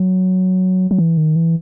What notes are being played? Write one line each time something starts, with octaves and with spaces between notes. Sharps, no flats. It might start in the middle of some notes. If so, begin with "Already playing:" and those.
Already playing: F#3
F#3
E3
D#3
E3